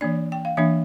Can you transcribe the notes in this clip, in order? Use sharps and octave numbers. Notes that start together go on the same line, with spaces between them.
E3 A#3 D4 D5
G5
F5
E3 A#3 D4 E5